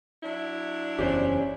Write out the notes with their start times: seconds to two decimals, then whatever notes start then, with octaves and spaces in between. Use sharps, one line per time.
0.23 F#3 D4 E4
0.99 F#1 E2 C#4 G4 C5 D5